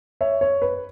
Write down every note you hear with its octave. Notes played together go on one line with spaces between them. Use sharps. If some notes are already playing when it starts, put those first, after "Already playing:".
C#5 E5
C#5
B4